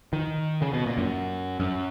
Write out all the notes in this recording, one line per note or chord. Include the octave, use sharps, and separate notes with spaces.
D#3
C#3
B2
A#2
F#2
F#2